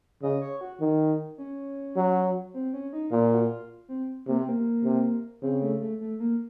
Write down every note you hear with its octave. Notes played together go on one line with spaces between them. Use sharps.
C#3 D#5
C#5
F#4
D#3
C#4
F#3
C4
C#4
D#4
A#2 F4
F#4
F4
C4
C3 A#3
C4
A#3
C3
C#3 C4
A3
A3
A3
A#3